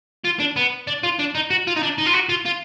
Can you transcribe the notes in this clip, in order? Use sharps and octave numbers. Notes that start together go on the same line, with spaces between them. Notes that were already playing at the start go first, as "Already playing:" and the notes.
F4
D4
B3
D4
F4
D4
D#4
F#4
F4
D#4
D4
D#4
F4
F#4
F4
F4